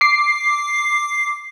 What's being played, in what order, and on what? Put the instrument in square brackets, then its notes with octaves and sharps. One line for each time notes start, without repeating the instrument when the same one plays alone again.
[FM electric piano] D6 C7